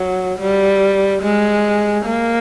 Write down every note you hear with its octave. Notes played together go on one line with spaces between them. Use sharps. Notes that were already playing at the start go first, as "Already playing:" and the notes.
Already playing: F#3
G3
G#3
A#3